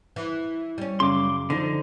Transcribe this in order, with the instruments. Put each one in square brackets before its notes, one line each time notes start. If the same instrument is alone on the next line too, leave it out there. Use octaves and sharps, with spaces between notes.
[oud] E3
G3 C#4
[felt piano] F#2 C#3 [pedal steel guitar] C6 D6
[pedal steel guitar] D3 D#4 [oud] F3